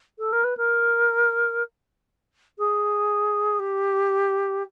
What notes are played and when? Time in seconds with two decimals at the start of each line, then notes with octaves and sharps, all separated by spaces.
0.19 A4
0.33 A#4
0.44 B4
0.57 A#4
2.58 G#4
3.59 G4